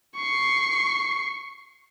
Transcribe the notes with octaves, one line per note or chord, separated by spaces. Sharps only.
C#6 C7